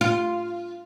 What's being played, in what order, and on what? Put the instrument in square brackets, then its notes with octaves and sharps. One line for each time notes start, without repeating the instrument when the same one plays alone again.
[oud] F4